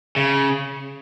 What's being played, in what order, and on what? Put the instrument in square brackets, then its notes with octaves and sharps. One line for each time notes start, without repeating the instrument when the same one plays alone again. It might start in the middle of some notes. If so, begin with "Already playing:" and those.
[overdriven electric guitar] C#3